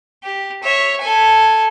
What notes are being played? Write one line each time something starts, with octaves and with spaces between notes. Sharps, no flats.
G4
C#5 E5
A4 G#5